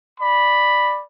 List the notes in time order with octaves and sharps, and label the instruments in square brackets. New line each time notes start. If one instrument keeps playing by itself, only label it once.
[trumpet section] D5 B5